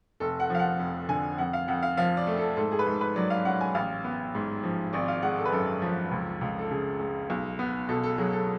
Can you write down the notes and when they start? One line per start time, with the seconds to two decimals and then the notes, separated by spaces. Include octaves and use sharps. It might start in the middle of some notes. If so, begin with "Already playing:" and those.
0.20 F1 A4
0.40 F#5
0.50 F3 F5
0.59 F#5
0.79 F2
1.09 D3 G#5
1.38 F2 F#5
1.53 F5
1.68 F2 F#5
1.83 F5
1.97 F3 F5
2.17 D5
2.27 A3
2.37 A4
2.56 G#2 A4
2.72 G#4
2.79 B4
2.86 G#2 A4
3.01 B4
3.16 F#3 D5
3.30 F5
3.45 C#4 F#5
3.61 G#5
3.75 A1 F5
4.04 B3
4.35 G#2
4.63 F3
4.93 G#1 D5
5.08 F5
5.23 G#3 F#5
5.38 A4
5.45 B4
5.52 F#2 A4
5.82 F3
6.11 C#2
6.41 C#2
6.59 A4
6.70 C#3 G#4
7.00 G#3
7.30 B1
7.59 B3
7.89 B2 A4
8.03 A4
8.18 F#3 G#4
8.33 A4